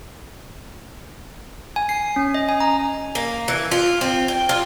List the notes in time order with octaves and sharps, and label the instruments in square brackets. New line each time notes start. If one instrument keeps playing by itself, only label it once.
[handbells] G#5
C7
C#4
D#5
G#5
A#5
[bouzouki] A#3
E3
F4
C4
G5
F4